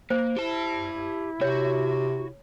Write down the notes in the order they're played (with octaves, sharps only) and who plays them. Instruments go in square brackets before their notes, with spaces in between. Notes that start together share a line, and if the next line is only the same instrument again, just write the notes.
[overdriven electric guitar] A#3 [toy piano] C5
[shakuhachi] E4 [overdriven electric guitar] G4 A5
[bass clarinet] C3 [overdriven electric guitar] F#4 [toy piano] C#5